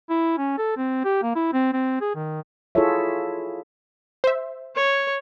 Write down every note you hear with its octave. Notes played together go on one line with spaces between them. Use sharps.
E4
C#4
A4
C4
G4
A#3
E4
C4
C4
G#4
D#3
E4 F4 G#4 A4 C#5 E5
C5 E5
C#5